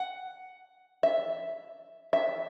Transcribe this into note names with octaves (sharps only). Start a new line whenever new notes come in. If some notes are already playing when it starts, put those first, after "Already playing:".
Already playing: F#5
E5
E5